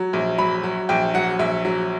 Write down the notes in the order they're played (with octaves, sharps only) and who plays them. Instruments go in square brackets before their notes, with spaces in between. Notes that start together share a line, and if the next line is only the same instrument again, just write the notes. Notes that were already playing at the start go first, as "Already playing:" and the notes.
Already playing: [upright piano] F#3
A#1
F#3 B5
F#3
A#1 G5
F#3 F#5
A#1 E5
F#3